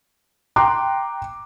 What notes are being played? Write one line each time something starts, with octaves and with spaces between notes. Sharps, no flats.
G5 A#5 C6 D6 F#6